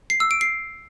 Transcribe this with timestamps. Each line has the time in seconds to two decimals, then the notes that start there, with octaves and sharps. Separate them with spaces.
0.10 C7
0.20 E6
0.31 D7
0.41 C7